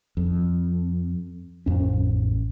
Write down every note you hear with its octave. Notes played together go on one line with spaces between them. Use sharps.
F2
A1 F2 C#4